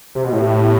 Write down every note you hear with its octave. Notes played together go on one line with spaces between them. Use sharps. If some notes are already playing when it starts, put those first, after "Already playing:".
C3
B2
A2 G4
B3